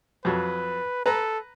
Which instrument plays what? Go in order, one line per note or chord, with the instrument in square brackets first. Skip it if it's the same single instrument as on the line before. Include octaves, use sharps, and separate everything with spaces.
[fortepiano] F2 F#3 [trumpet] B4
[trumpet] A4 [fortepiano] B4 A#5